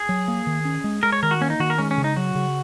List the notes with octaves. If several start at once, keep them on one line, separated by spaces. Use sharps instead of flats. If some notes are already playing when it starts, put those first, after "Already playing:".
Already playing: G#4
F#3
A#3
D#3
C#4
G#3
G#3 A#4
C#5
D#3 A#4
F#4
A#3 C#4
D#4
D#3 F#4
A#4
G#3 C#4
C#4
C#3
D#4
F#3 F#4
C#3